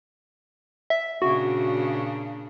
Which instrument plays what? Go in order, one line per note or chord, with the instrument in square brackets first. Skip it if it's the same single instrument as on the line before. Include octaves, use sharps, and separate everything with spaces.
[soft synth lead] E5
[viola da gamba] A#2 C#3 D4 [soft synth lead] F#4